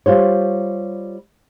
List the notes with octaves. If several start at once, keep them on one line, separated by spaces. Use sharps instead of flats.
G3 F4 C5 C#5